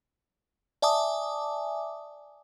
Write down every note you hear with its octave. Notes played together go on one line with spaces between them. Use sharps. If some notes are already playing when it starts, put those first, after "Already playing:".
D5 E5 G#5 A5 D6 D#6